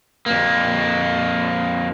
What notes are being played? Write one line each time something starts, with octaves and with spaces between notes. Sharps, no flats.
F2 A#3